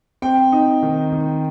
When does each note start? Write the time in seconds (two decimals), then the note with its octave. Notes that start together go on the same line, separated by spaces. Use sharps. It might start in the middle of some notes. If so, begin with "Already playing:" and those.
0.22 C4 G5
0.52 D#4
0.83 D#3
1.12 D#3